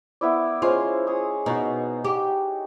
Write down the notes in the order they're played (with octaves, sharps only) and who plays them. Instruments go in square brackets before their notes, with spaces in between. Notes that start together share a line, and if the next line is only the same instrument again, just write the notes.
[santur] B3 E4 D5
[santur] G#3 C#4 C5 [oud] F4
[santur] G#4 C#5 D#6
[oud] B2 [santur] D#4 F#4
[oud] G4